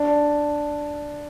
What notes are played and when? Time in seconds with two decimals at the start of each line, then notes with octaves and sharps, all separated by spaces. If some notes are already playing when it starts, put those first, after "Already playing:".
Already playing: D4